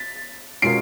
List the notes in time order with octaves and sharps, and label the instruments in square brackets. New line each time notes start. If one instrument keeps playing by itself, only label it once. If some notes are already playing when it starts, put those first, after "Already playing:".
Already playing: [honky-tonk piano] A6 B6
[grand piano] B2 G#3 C#4 F4 A#4 [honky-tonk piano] C7 D7